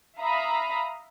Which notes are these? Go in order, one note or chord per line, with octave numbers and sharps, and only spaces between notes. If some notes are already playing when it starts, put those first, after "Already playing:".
E5 F5 A#5 B5 D#6